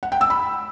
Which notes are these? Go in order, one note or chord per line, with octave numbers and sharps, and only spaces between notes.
F#5
G5
E6
B5